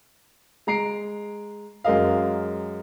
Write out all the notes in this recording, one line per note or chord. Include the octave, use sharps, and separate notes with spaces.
G#3 A#5 C7 D7
F#2 G#3 A#4 D#5 F5